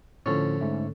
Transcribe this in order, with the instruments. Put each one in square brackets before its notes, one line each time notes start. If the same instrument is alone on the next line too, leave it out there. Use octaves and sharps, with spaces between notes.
[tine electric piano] A2 F3 [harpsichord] D3 C#4
[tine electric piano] G#2 A3